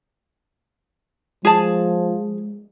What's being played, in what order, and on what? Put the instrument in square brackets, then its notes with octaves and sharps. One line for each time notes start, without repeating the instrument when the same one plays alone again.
[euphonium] F3 [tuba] G#3 [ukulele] G#4 A5